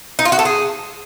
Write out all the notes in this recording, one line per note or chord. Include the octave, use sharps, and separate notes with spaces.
D#4
F4
F#4
A4
G#4